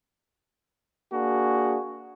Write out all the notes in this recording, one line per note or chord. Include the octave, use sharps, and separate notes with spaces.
A#3 D4 F#4 G#4